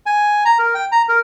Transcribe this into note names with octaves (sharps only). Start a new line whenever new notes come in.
G#5
A#5
A#4
G5
A#5
A#4